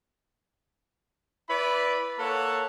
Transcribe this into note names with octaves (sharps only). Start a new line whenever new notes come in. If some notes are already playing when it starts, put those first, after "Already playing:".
E4 B4 D5 B5
A#3 A4 C#5 F#5